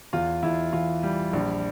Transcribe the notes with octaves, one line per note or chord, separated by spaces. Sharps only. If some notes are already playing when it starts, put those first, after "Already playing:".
E2 F4
E2 E4
E3 F4
G3
A#1